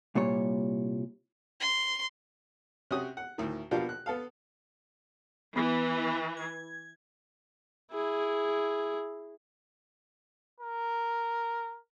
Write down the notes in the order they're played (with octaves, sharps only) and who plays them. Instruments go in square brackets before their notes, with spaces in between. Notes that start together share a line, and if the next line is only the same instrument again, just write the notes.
[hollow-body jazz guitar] C2 A#2 G3 C#5
[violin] C6
[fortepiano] C3 C#4 F#4 D#6
F#5
D2 A2 D#3
B2 F3 A#3 D4 F4 G4
F#6
B3 A4 F5
[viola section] E3 [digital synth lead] B3
[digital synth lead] G#6
[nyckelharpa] E4 G#4
[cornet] A#4